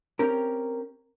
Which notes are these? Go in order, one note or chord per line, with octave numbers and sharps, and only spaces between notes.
C4 C#4 G4 A#4